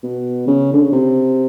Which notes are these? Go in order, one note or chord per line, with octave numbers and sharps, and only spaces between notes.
B2
C#3
D3
C#3
C3